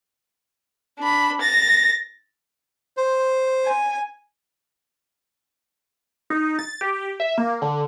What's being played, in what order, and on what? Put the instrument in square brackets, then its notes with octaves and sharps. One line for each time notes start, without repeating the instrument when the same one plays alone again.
[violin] D4 B5
A6 A#6
[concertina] C5
[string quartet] G#5
[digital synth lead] D#4
A6
G4
E5
A#3
D3